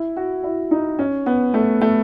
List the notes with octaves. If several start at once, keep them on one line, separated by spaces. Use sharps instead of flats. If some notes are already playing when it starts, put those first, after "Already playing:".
Already playing: E4
F#4
E4
D#4
C#4
B3
A3
A3